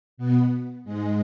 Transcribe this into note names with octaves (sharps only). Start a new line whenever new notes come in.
B2 B3
G#2 G#3